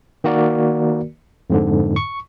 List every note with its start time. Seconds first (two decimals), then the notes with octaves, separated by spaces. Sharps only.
0.24 D#3 A#3 F#4 A#4 D5
1.50 F2 G#2 D3
1.96 C#6